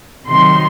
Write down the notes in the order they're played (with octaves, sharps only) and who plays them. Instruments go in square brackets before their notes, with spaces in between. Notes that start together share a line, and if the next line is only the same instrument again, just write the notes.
[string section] C3 D#3 F#3 C6